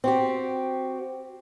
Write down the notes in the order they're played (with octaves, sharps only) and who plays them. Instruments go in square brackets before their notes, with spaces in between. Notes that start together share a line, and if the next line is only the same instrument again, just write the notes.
[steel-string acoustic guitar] C4 F#4 G4